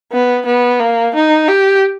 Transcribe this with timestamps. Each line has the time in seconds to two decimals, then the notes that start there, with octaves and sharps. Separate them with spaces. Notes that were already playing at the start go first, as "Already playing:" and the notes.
0.13 B3
0.46 B3
0.80 A#3
1.15 D#4
1.48 G4